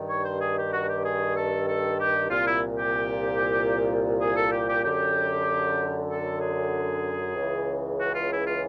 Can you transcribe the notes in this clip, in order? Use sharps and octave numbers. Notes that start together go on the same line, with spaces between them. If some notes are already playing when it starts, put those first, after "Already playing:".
Already playing: G2 D#3
C#5
C5
G#4
G4
F#4
G4
G#4
A4
A4
G4
C2 A#2 F4
E4
G4
G#4
A4
G4
G4
F#2 D3 G4
A4
G#4
C#2 C#3 E3
F#4
F4
E4
F4